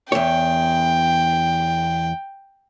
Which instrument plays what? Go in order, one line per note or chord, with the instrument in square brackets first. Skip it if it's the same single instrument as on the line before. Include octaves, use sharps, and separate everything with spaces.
[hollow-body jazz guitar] E2 C#5 [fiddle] G5